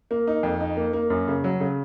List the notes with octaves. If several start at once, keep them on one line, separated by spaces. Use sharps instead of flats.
A#3
D#4
F2
D#4
A#3
A#3
F#2
C#3
F#3
C#3